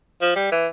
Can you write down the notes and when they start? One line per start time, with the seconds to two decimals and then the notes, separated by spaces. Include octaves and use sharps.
0.21 F3
0.36 G3
0.52 E3